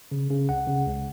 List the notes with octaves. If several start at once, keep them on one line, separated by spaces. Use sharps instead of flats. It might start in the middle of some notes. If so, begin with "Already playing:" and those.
C#3
C#3
C#2 F#5
C#3
C#2